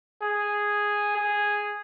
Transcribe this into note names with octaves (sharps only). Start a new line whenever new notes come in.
G#4
G#4